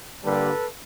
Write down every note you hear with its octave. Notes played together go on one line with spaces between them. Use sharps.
G2 D3 G3 A#3 A4 B4